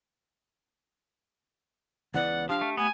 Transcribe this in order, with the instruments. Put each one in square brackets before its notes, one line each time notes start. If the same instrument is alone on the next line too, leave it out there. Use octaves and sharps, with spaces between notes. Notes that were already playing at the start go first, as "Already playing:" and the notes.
[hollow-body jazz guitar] C#2 E3 B3 [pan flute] D5 [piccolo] F#5
[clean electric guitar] F3 [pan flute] D4 [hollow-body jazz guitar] G4 [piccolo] F5
[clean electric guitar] A3
[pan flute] A3 [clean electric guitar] B3 [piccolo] G#5